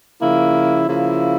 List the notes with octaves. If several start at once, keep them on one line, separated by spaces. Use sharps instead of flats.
C#3 F3 A#3 E4
C#3 F3 A#3 E4